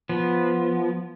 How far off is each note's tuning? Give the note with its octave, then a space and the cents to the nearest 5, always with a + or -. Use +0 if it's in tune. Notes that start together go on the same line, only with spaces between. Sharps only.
F3 -5 B3 -10